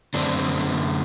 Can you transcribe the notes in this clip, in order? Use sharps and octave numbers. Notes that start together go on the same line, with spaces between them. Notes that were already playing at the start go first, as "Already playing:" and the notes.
F#2 D3 A3 C4 D4